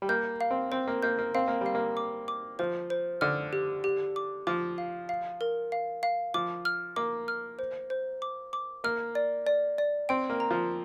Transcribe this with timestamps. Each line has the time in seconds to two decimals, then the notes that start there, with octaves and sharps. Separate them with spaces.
0.02 G3
0.09 A#3 G6
0.41 F5
0.51 C4
0.72 C4 C5
0.87 A#3
1.03 A#3 G6
1.19 A#3
1.35 C4 F5
1.48 A#3
1.61 G3 F5
1.75 A#3
1.97 D6
2.28 D6
2.59 F3 C5
2.90 C5
3.21 D3 F6
3.53 G4
3.84 G4
4.16 D6
4.47 F3 D6
4.78 F5
5.09 F5
5.41 A#4
5.72 F5
6.03 F5
6.34 F3 D6
6.65 F6
6.96 A#3 D6
7.28 F6
7.59 C5
7.90 C5
8.22 D6
8.53 D6
8.84 A#3 F6
9.15 D5
9.47 D5
9.78 D5
10.09 C4 G5
10.30 A#3
10.40 A#5
10.51 F3